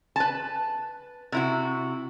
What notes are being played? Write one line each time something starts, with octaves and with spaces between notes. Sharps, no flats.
B4 A5
C3 E4 F#4